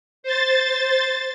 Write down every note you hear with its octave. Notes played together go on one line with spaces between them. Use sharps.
C5 A6